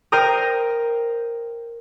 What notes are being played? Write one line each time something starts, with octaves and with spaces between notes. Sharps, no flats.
A#4 C5 G5 A#5 D#6